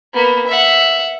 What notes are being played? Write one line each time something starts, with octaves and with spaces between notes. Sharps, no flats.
A#3 B3
E5 F#5